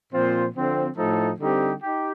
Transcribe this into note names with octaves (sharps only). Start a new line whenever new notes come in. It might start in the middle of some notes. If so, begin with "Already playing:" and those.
A#2 F3 C4 F4 C5
D3 F3 C4
A2 F3 A3 D#4 A4
D3 G3 C4 D#4 G4
D#4 G4